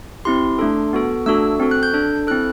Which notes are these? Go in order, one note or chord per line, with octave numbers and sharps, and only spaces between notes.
C4 E4 G4 C6
A3 D4 A4
B3 F#4 A4
A3 D4 F#4 A4 E6
C4 F#4 A4
F#6
G6
D4 A4
C4 E4 A4 F#6